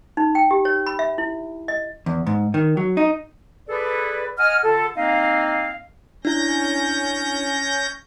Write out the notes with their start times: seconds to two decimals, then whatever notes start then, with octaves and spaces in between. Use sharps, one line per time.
0.17 D#4
0.35 G5
0.51 G4
0.65 C#5
0.86 B5
0.99 E5
1.18 E4
1.68 D#5
2.06 E2
2.27 G#2
2.54 D#3
2.77 F#3
2.97 D#4
3.69 G#4 A4 B4 D5
4.39 D#5 F#5 G#5 D#6 F6
4.63 D3 F4 A4
4.96 A#3 C4 D#4 D#5 F5
6.25 C#4 D4 E4 G6 A#6